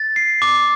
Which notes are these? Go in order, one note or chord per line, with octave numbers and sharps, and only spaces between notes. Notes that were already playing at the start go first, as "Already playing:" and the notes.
Already playing: A6
C7
D6